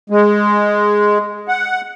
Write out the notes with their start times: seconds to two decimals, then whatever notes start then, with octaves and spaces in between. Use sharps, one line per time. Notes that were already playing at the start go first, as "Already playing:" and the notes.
0.10 G#3
1.48 F#5